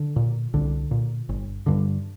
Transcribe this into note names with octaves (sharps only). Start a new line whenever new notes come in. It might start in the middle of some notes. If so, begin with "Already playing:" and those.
Already playing: D3
A#2
C2 D3
A#2
G1
G2 D3